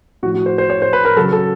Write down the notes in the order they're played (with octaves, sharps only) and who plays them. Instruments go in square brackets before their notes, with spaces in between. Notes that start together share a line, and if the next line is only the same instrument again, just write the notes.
[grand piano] A2 F3 F#4
F#4
C5
C5
C#5
C5
B4
A#4
C#3 F#3 A4
A4